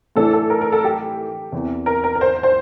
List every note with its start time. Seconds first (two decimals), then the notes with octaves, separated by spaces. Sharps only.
0.16 A2 E3 A3 D4 A4
0.33 A4
0.50 A#4
0.61 A#4
0.72 A4
0.84 G4
1.52 E2 C3 E3
1.86 A#4
2.04 A#4
2.15 A#4
2.21 C5
2.43 C5